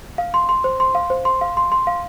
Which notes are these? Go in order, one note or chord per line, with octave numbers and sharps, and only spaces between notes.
F5
C6
C6
C5
C6
F5
C5
C6
F5
C6
C6
F5